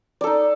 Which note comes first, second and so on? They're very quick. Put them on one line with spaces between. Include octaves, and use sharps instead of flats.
D5 A4 D#4